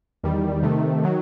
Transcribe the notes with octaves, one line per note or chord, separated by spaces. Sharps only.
E2 D#3 G3
C3 D#3 A3
D#3 F#3